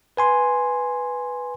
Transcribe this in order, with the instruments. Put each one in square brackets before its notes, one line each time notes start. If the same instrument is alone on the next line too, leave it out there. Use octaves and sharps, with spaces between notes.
[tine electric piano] B4 G#5 C6